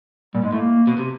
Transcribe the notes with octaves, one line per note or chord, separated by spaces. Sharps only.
A#2 G3
G#2 G#3
A2 A3
A#3
B2
C3